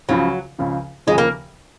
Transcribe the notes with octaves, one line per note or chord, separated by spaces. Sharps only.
C#2 C#3 F3 F#3
C#2 C#3 F3
D#2 C#3 F3 G#3
A#3